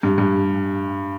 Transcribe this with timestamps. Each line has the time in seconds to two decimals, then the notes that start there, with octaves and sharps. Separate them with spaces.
0.03 G2
0.18 G2